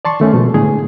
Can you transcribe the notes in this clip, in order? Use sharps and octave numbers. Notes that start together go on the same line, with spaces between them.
D5 A5 C6 C#6
D#3 A3 C#4
B2 F3 G#3
A2 D3 G#4